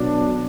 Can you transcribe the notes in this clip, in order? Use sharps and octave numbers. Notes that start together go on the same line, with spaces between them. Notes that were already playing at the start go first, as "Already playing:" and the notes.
Already playing: B1 B2 F#3 D4